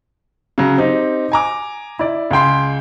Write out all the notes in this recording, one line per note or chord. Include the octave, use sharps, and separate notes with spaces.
C#3 F#3
C4 D#4 G4
G#5 A#5 D6
E4 D5
C#2 G#4 G5 C6